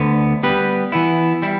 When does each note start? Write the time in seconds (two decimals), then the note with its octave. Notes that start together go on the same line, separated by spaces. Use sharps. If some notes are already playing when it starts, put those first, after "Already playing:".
Already playing: D2 D3 B3
0.43 G3 B3 G4 B4
0.92 E3 B3 E4
1.42 G3 E4